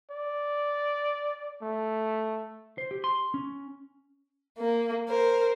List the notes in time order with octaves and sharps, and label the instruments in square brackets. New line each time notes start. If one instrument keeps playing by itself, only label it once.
[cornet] D5
A3
[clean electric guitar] C5
G4
C6
C#4
[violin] A#3
A#4 C5